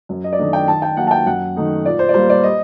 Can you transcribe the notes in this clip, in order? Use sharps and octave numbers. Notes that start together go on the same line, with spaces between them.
F#2
D#5
D5
D#3 A3 D4 D#5
G5
D#3 A5
G5
F#3 A#3 F#5
A5
G5
F#2 F#5
D#3 A3 D#4
A#2 D5
C5
D5
G3 A#3 C5
D5
D#5